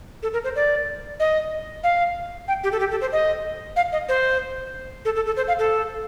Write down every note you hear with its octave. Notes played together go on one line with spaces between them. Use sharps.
A4
A#4
C5
D5
D#5
F5
G5
G4
A4
G4
A4
C5
D#5
F5
D#5
C5
A4
A4
A4
C5
F5
A4